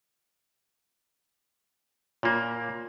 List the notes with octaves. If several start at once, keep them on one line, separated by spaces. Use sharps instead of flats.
A#2 A#3 F4 C#5